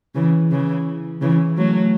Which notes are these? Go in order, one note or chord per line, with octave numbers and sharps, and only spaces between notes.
C#3 E3
C#3 E3
C#3 E3
F#3 A3